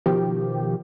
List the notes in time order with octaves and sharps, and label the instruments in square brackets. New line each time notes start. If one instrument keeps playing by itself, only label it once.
[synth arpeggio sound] B2 D#3 F3 G4